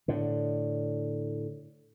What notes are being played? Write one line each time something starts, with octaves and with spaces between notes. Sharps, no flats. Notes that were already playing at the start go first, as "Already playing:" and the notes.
A2 D3